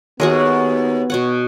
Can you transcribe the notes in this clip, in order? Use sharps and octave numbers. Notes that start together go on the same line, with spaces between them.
D#2 B3 F#4 G#4 A#4
B2 C#5 F#5